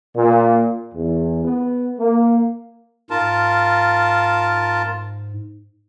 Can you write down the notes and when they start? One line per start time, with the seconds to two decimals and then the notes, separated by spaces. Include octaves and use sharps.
0.16 A#2
0.94 E2
1.44 B3
1.99 A#3
3.10 G#2 F4 A#4 A5